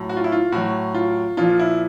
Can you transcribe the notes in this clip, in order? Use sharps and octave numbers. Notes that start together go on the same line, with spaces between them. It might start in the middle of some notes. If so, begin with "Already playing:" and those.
Already playing: A2 F#3
F#4
F4
E4
F4
A2 F#3 F#4
F4
A#2 F3 F4
E4